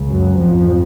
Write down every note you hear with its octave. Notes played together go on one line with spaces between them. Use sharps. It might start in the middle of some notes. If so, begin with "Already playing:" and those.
Already playing: C#2 C#3
F#2 F#3
A1 F2 G#2 F3